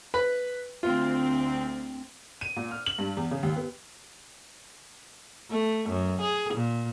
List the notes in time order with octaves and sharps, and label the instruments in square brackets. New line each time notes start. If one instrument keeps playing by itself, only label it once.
[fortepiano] B4 B5
[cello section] D2 C4 [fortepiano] F4
[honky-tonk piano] D#7
A#2
F6
F#7
G2
E2
C#3
D#2
B3
[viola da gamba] A3
F#2
G#4
A#2